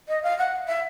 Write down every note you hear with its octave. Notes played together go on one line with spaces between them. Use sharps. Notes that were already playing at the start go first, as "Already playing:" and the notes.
D#5
F5
F#5
E5